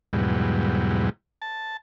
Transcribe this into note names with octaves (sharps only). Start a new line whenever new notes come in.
E2 G#2 B2 F#3 G3
A5